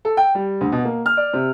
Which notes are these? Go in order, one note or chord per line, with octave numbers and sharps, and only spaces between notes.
A4
G5
G3
D2
B2
A#3
F6
D5
C3